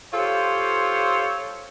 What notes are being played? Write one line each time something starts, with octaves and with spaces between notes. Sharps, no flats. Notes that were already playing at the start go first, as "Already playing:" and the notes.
F4 G4 A4 C5 C#5